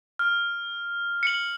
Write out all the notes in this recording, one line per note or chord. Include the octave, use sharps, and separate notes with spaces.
F6
C#7 F#7